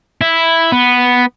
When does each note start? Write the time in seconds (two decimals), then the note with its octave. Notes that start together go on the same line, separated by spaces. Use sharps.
0.21 E4
0.72 B3